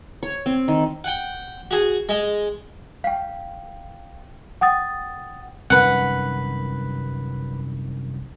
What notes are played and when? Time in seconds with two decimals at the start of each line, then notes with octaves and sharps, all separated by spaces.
0.23 C#5
0.46 C4
0.68 D#3
1.04 F#5 G5
1.71 F#4 G#4
2.09 G#3
3.04 F5 G5
4.61 F#5 G5 D#6 A6
5.70 C2 F#2 D#3 B4 F#5